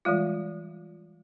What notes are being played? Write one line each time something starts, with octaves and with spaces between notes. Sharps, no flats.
E3 G3 G#3 F4